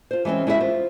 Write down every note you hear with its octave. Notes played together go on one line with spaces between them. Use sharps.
F4 C5
E3 G#3 A#3 C4 C#4
G#3 E4 F#4 G#4 A#4 E5
F4 C5